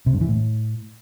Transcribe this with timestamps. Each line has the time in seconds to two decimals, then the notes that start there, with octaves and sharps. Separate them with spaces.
0.06 C3
0.14 G2
0.21 E3
0.28 A2